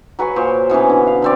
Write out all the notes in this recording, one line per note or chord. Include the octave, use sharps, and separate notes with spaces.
F#3 B4 G#5 C#6
A#2 C5 C#5
B2 E3 C#4 B4
D3
F5
D3 C4 D5